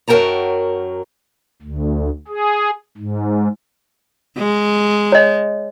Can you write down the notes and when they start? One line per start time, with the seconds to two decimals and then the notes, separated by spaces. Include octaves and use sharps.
0.08 F#2 F#3 A#4 G5 A5 A#5
1.62 D2
2.28 G#4
2.97 G#2
4.38 G#3
5.12 C#5 D#5